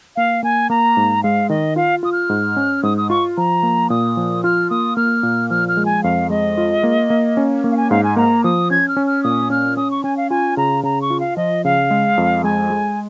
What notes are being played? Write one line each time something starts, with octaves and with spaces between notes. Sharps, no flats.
A#3 F5
A#3 G#5
A#3 A#5
G#2
G#3 F5
D#3 D#5
F4 F5
F4 D#6
F6
G#2
C#4
G#2 D#6
D#6
F4 C#6
F3 A#5
A#3
A#2 D#6
F3
F4 F6
A#3 D#6
A#3 F6
A#2
F3 F6
F6
G#3
G#5
F2 F5
G#3 D#5
F4
A#3
A#3
C#4
A#3
F5
G#5
G#2 F5
G#5
A#3 A#5
F3 D#6
C#4 G#6
F6
C#4
F6
A#2 D#6
C#4 F6
C#4 D#6
C#6
C#4 G#5
F5
F4 G#5
C#3 A#5
C#3 A#5
C#6
F4
F5
F3 D#5
C#3 F5
G#3
F2
G#3 G#5
G#3